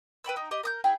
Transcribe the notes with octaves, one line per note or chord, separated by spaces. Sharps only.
B4 G5 B5 E6
D#4 G5
G4 D#5
A#4 D#6 G6
E4 G#4 G5